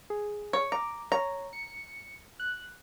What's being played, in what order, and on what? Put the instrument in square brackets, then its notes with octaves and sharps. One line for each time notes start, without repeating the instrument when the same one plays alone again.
[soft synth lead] G#4
[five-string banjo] C#5
[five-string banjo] A#5 [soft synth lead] D6
[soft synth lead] C#5 [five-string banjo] A#5
[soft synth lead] C#7
F#6